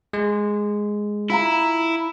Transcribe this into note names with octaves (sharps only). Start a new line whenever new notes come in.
G#3
E4 F4 F5 A#5